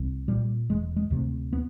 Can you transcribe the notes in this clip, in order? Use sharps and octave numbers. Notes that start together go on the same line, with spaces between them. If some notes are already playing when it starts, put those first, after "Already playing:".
Already playing: C2
A#2 G3
E1 G#3
G#3
D2 C3
B3